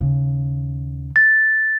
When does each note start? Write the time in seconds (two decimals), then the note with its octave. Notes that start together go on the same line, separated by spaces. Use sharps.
0.01 D#2 C#3
1.16 A6